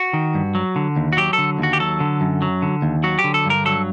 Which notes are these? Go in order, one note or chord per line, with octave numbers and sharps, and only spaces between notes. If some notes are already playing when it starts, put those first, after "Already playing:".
Already playing: F#4
D#3
G2
F#3
D3
D#2
F#4
F#3 G4
A4
D3
D#2 F#4
G4
F#3 A4
D3
F#2
F#3
D3
D#2
F#3 F#4
G4
D3
A4
G2 A#4
F#3 A4